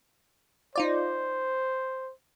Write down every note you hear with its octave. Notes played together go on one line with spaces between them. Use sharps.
D#4 F4 C5 D5